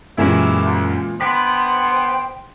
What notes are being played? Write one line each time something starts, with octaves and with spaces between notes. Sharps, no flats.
F#2 A#2 D#3 E3 F#3 G#3 E4 G4
D2
D3 B3 C5 G5 B6